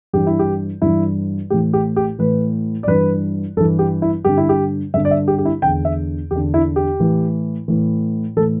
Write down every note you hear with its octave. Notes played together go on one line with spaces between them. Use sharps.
G2 E3 G4
E4
G4
G2 E3 E4
A2 E3 G4
G4
G4
A2 E3 B4
D5
G2 E3 B4
G2 E3 A4
G4
E4
G2 D3 G4
E4
G4
G2 D3 E5
D5
E5
G4
G4
E4
E2 D3 G5
E5
E2 D3 G4
E4
G4
A2 E3
A2 E3
A2 E3 A4